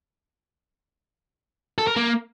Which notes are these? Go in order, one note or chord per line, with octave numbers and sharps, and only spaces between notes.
A4
A#4
A#3